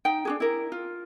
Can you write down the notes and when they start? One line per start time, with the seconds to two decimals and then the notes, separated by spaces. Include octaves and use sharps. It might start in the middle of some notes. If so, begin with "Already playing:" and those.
0.05 D#4 G5
0.25 D4 F#4 G#4
0.40 E4 A#4
0.72 F4